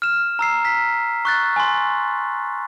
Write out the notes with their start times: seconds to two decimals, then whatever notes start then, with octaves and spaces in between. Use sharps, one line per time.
0.02 F6 E7
0.39 A#5 E6 C7
0.65 B6
1.25 C#6 F#6 A6
1.56 G#5 C6